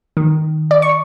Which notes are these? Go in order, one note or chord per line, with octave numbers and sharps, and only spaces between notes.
D#3
D5
C#6